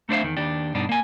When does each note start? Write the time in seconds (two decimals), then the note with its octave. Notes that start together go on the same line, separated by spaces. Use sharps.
0.09 A3 D4 C5 D5 E5 F5
0.22 E2 D#3
0.37 D#2 D4 G4
0.75 G2 B2 D4 D#4
0.89 A#3 G#5